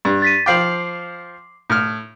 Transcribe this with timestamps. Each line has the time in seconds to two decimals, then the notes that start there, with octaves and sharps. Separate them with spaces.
0.05 G2
0.22 A6 B6 D#7
0.46 F3 F5 G5 D6 C7 F#7
1.70 A2 F6